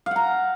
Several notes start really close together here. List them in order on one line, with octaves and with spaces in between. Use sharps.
F5 F#5 A#5